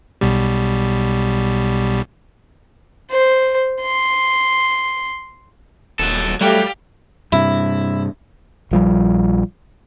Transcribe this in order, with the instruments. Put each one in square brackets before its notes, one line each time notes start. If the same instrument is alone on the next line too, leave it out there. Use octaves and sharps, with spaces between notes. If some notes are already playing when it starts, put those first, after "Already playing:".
[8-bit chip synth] B1 B2 G3
[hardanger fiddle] C5
C6
[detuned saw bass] D#1 [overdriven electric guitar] F#3 A4
[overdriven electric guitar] F#3 [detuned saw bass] G3 [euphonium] A3 [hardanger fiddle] G4 F5
[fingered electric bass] G2 C3 [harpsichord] E4
[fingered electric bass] A#1 F3 G3